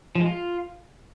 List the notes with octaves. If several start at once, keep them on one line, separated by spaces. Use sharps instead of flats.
F3
G#3
F4